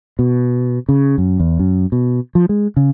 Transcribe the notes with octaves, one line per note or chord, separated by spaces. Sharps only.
B2
C#3
F#2
E2
F#2
B2
F3
G#3
C#3